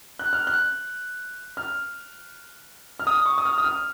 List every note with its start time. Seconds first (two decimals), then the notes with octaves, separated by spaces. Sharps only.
0.19 F#6
0.33 F6
0.47 F#6
1.57 F6
3.00 F6
3.07 D#6
3.26 C#6
3.38 D#6
3.45 F6
3.58 D#6
3.64 F6